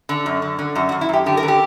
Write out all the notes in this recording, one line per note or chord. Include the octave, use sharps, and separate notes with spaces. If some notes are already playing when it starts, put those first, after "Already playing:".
D3
F#2
D3
D3
F#2 F#4
F#4
F#2
E4
F#2 G4
D3 G4
A#4
D3
G4